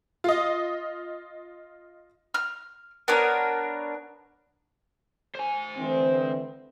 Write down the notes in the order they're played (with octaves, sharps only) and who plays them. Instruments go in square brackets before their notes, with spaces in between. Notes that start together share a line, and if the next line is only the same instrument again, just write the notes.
[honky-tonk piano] F4 D#5
[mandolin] F6
B3 D4 A#4 C#5
[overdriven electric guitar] C5 G#5
[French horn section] D3 E3 C4